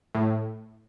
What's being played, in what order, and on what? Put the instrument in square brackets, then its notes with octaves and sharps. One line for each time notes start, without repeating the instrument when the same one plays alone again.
[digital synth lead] A2